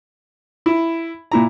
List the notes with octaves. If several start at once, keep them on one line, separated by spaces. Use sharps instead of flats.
E4
A#2 E4 A#5